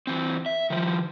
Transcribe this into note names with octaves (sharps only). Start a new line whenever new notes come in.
E3 C4
E5
D#3 F3